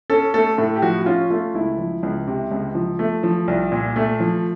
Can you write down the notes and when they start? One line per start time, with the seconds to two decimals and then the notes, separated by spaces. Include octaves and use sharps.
0.10 C#4 A4
0.34 A3 A4
0.58 A2 A4
0.76 G4
0.82 F3 F#4
1.01 F#4
1.06 C#4 F4
1.30 A3 F4
1.55 C#2 E4
1.78 F3
2.03 C#2
2.28 C3
2.51 C#2
2.75 F3
2.99 A3
3.23 F3
3.48 C2
3.72 A#2
3.96 A3
4.20 F3